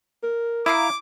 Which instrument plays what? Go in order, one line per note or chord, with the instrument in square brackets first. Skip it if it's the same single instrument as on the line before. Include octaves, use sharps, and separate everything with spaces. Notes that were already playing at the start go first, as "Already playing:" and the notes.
[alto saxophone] A#4
[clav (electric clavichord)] E4 [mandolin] F5 A#5 D#6 [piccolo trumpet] D6